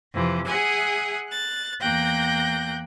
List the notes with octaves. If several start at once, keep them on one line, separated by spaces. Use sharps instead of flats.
F2 C3 E3
G#4 E5 F#5 G#5
F#6 A6
E2 A#3 G5 F#6 G6 A#6